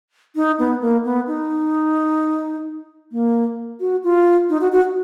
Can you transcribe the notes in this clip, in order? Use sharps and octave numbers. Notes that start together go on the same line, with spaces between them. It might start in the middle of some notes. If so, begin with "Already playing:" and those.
D#4
B3
A#3
B3
D#4
A#3
F#4
F4
D#4
F#4
F#4